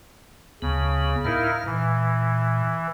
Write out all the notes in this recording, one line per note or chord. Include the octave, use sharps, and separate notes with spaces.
D2 C#3 B3
A2 D#4 E4 A#4 F5
A#2 E3